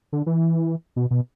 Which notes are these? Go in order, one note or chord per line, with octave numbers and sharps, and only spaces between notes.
D3
E3
B2
B2